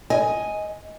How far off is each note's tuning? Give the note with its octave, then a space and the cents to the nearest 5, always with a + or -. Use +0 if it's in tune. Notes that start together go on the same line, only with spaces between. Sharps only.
D#5 +15 G#5 +0